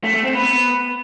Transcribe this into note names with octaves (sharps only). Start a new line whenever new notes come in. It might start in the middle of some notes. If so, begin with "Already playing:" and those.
A3
A3
C4
B3